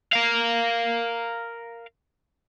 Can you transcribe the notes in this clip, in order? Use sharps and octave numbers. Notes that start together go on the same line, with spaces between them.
A#4 F5